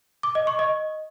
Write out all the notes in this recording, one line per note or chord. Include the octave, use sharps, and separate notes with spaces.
D6
D#5
C#6
D#5